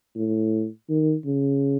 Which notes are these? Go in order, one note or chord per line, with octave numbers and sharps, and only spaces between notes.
A2
D#3
C#3